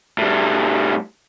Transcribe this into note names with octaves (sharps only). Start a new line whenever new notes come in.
A2 G3